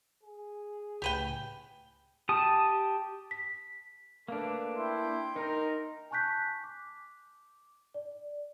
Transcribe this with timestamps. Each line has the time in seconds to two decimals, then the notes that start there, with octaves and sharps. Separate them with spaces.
0.23 G#4
1.02 C#2 A2 G4 B4 G5
2.29 G4 A5 D#6
3.31 B6
4.28 A3 A#3 D4 B4
4.77 E4 G5 C6
5.36 D#4 A#4
6.11 G#5 A5 C#6 F#6 G6 B6
6.64 D6
7.94 D5